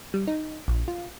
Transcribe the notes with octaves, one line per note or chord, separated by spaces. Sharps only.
G3
D#4
A#1
F4